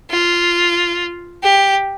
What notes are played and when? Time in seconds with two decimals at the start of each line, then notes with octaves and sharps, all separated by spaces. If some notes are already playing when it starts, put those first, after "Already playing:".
0.11 F4
1.43 G4